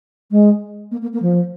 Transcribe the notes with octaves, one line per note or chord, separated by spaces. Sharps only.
G#3
A#3
A#3
A#3
F3